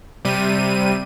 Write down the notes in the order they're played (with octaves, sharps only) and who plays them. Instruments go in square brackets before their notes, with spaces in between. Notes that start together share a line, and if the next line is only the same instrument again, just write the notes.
[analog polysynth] C3 G3 D#7